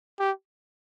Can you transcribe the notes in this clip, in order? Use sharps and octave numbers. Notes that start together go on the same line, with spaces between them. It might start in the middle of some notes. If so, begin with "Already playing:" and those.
G4